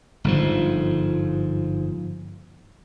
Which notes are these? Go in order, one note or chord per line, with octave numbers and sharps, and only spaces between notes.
G1 G#2 F3